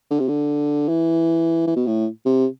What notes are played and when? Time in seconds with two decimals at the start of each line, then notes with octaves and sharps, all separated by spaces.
0.11 D3
0.20 C3
0.28 D3
0.88 E3
1.67 E3
1.76 B2
1.87 A2
2.26 C3